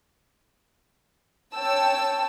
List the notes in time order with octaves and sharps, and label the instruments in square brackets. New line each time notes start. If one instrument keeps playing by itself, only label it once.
[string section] C#5 G5 A5 E6